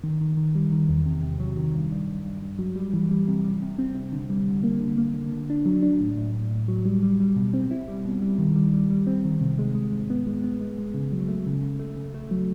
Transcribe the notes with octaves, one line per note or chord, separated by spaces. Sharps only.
D#3
D#3
D#3
G3
D#3
E2
C3
C3
F#3
D#3
G2
G2
G2
G2
G2
F#3
G3
E3
G3
C3
G3
C3
C4
C3
D3
G3
D3
A#3
D3
A#3
D3
D3
D4
F#3
D4
A2
A2
A2
A2
F#3
G3
G3
G3
B2
C4
E4
G3
B2
G3
D#3
G3
G3
G3
C4
D#3
C3
G#3
G#3
G#2
B3
G#3
B3
G#3
G#3
C#3
F#3
A3
C#3
C#3
A3
C#3
A3
F#3